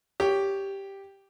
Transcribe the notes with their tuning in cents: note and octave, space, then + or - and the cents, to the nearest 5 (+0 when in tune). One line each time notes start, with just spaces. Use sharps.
G4 +0 C#5 +15